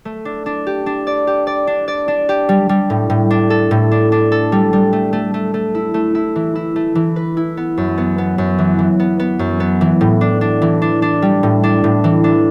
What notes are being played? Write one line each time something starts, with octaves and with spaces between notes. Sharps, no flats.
A3
D4
D4
G4
D4
D5
G4
D5
D4
D5
D4
G4
G3
G3
A2
A2
D4
A4
A2
D4
D4
A4
G3
G3
A3
A3
A3
A3
E4
A3
E4
E3
E4
A3
E3
B4
E4
B3
F#2
B3
B3
F#2
E3
E3
B3
B3
F#2
B3
E3
A2
D4
D4
E3
D4
D4
G3
A2
D4
A2
E3
D4